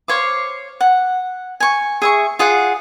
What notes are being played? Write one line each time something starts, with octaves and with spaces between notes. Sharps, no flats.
C5 C#5 F5 D6
F#5
G#5 C#6
G#4 E5 C#6
F4 G#4 F#5